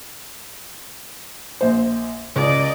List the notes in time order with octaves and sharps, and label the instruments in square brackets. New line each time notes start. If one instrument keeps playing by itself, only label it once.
[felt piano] A#1 C5
[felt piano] C#2 [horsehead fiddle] D5 D#5